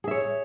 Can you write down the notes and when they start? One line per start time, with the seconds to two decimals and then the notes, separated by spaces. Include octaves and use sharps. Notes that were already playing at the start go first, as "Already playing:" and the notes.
0.04 G#4
0.08 E5
0.11 C#5